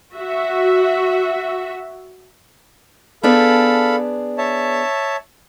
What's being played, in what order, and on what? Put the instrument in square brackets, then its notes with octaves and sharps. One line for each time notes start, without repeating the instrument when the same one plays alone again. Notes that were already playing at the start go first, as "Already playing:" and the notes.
[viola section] F#4 E5
[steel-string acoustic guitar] B3 D4 G#4 [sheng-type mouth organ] A4 F5 B5
[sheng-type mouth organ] C#5 E5 A5